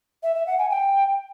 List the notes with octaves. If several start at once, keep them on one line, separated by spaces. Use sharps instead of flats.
E5
E5
F#5
G#5
G5